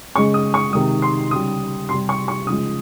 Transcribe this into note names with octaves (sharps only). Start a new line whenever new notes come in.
C#3 G#3 C#6
D#6
C#6
C3 D#3 G#3 D#6
C6
C#3 G3 D#6
C3 G3 C6
C#6
C#6
C#3 F3 G#3 D#6